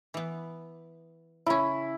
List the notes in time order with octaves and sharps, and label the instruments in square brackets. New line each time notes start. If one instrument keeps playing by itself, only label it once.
[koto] E3 B3
[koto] C#3 C#4 [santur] E4